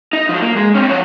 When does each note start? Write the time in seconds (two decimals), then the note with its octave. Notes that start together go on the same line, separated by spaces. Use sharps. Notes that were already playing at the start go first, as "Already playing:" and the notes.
0.13 D#4
0.29 F3 F#3
0.42 A#3
0.56 G#3
0.75 C4 C#4
0.90 F3 C#5